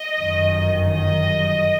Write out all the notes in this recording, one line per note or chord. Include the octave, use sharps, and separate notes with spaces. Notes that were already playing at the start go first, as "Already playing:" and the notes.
Already playing: D#5
G1 F#2 D#3
D#5